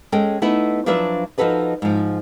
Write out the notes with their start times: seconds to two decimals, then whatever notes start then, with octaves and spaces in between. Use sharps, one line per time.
0.12 G#3 C#4 A4 D#5 G5
0.42 A3 B3 D#4 E4
0.86 F3 F#3 D4 F4 B4 E5
1.38 F3 D#4 F#4 A4 B4 D#5
1.82 G#2 F3